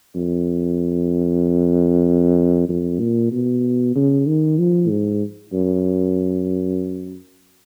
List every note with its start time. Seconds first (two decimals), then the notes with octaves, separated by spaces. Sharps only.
0.16 F2
2.69 F2
3.00 A#2
3.32 B2
3.96 C#3
4.27 D#3
4.59 F3
4.90 G#2
5.53 F#2